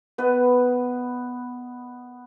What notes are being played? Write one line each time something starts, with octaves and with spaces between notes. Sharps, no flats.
B3 B4 D#5